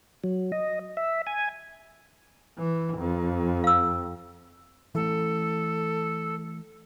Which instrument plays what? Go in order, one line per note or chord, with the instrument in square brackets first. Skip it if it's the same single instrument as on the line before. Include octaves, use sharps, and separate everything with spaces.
[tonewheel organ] F#3
D#5
E5
G#5
[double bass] E3
F2
[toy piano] F5 E6
[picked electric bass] E3 A3 [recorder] A4